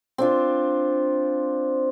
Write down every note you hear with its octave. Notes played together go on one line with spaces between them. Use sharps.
C4 D4 F4